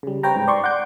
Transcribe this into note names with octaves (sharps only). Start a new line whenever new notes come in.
C#3 G3
C4 B4 C#5 G5 A#5
G#2
D5 C6 C#6
F#5 D6 G6